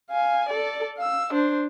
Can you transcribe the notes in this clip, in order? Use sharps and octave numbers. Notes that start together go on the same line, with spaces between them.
F5 G#5
A4 D5
F5 E6
D4 C5